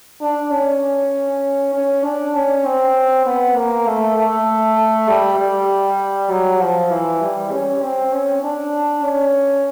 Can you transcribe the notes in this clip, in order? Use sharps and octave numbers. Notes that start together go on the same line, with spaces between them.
D4
C#4
C#4
D4
C#4
C4
B3
A#3
A3
A3
G3
G3
F#3
F3
E3
G3
C#4
C4
C#4
D4
C#4